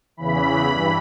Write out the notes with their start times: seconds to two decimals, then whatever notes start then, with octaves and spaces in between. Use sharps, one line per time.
0.17 E2 C#3 E3 B5
0.68 G2 E3